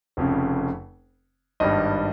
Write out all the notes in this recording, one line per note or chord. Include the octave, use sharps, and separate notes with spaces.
F1 F2 C#3
G#1 G2 G3 D#5